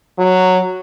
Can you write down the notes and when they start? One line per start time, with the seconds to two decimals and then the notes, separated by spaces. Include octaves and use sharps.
0.18 F#3